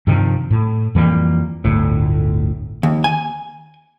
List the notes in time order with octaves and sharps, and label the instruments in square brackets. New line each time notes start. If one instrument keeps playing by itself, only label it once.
[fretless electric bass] G2 C3 D#3 F3
A2
F2 E3 G3 A#3
G1 D2 A2
[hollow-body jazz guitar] D#2
G#5